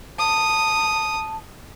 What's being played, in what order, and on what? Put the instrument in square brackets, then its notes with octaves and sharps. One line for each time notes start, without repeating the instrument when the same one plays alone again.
[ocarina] A5 [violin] D#6